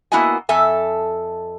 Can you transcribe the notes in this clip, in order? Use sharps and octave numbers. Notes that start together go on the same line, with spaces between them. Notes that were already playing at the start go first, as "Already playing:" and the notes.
A#3 B3 E4 F#4 D#5 G#5
F2 A4 E5 G#5